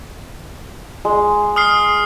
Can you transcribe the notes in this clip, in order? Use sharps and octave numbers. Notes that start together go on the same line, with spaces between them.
G#3
D#6 F6 C7